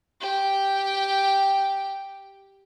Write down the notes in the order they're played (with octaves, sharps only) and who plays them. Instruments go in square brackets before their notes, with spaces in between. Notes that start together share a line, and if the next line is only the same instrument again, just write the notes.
[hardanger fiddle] G4 G5